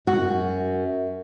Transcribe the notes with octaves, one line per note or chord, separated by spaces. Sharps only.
F#2 F#4